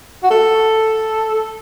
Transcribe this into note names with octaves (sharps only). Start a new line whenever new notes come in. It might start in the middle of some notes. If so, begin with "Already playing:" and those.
F#4
A4